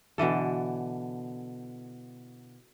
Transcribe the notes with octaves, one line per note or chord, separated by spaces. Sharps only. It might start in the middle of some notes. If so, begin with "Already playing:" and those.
B2 D3 E3 A4